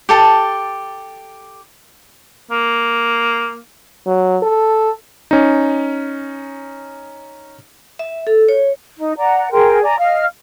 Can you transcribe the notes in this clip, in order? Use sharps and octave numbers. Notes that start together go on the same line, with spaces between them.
G4 A4 A5
A#3
F#3
A4
C#4 D#4
E5
A4
C#5
D#4
D5 F#5 A#5
G#4 A#4 G5 C6
D5 G#5 A#5
D#5 F5 F6